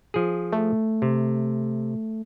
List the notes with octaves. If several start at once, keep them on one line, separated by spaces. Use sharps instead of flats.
F3 G#4
A3
C3